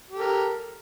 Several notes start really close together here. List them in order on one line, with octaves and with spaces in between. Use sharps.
G4 A4 A#4